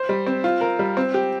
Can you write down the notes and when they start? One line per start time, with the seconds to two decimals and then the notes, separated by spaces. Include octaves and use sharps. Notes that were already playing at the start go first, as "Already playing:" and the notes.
Already playing: C5
0.09 G3
0.27 C4
0.44 F4
0.61 A#4
0.79 G3
0.97 C4
1.14 G4